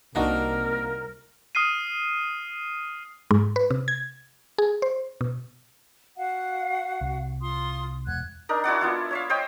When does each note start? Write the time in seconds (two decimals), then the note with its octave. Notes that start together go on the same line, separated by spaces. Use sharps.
0.15 C2 A#3 D4 D#4 F#4 A#4
1.55 D#6 F6 C7 D#7
3.31 G#2
3.56 B4
3.71 C3
3.88 G#6
4.58 G#4
4.82 C5
5.21 B2
6.16 F#4 F5 F#5
7.01 C2
7.40 F4 C6 D#6
8.07 E1 F#5 F#6 G#6
8.49 D4 D#4 A#4
8.64 E4 F#4 D5 F#5
8.81 B3 E4 F4
9.11 C#5 E5 F5
9.30 C5 C#5 D#5 G5